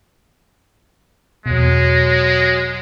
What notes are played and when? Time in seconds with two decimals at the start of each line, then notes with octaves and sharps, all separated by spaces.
1.46 E2 B2 F#3 G#3